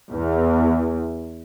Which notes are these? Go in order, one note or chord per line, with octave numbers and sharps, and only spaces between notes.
E2